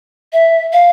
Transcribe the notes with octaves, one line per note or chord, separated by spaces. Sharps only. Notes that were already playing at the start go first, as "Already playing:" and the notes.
E5
F5